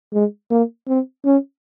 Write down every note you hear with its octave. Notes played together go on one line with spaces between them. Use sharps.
G#3
A#3
C4
C#4